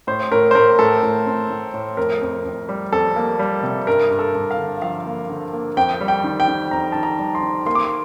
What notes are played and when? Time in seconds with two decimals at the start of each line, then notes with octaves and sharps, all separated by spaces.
0.07 A2 C5
0.32 A2 A#4
0.51 C5
0.55 A2 A#4
0.79 A2 A4
1.02 A2
1.26 C4
1.50 A2
1.74 A2
1.97 F2 A#4
2.21 F2
2.45 F2
2.69 G3
2.92 F2 A4
3.16 A#3
3.39 G3
3.63 C3
3.87 G2 A#4
4.11 G2
4.19 A4
4.35 G2
4.51 F5
4.58 D3
4.82 F3 F5
5.06 A#3
5.29 D3
5.53 A#3
5.77 F2 G5
6.01 G3
6.08 G5
6.24 D#3
6.40 G5
6.48 D#3
6.71 F2 A#5
6.92 D#3 A5
7.03 A#5
7.19 G3
7.35 C6
7.43 D#3
7.66 A#3 C6
7.75 D6
7.85 C6